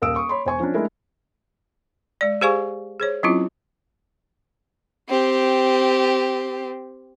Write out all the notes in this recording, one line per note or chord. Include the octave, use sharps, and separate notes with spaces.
D#1 A#4 F5 D#6 E6 D7
C#6 D#6
C#5 B5 C6
E1 C5 G#5 C#6
F3 C#4 D4
G#3 A3 D4 E4 A#4
G#3 D5
G4 G#4 C5 F5 G#5 C#6
G#4 C5 C#5
F#3 C4 C#4 E4 F4
C4 G4